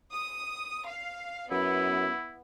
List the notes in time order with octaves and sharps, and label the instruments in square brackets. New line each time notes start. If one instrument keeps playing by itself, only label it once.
[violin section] D#6
F5
[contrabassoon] F#2 [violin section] B3 [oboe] E4